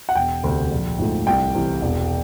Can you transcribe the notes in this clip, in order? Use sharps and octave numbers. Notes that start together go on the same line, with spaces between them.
F#5
E1 G5
D2 C3
A#1
G#2 F3 A3
C2 G5
C3 E3
E1